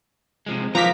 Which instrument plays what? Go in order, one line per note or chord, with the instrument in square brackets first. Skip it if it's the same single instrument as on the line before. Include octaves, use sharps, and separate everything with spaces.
[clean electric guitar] C3 F3 G#3
[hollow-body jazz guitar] F3 [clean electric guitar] F#3 A#4 [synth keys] A#5 D6 B6